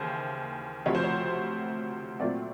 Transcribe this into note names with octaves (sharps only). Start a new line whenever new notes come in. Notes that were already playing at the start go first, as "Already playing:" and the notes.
Already playing: D#2 C#3 E3 C5
D2 C3 F3 C#5
C5
C#5
A#2 F#3 A3 C4 D5